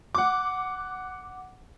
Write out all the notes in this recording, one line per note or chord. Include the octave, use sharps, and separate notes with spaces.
F#5 D6